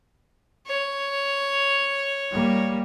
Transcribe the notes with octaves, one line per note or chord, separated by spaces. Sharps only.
C#5
G3 A#3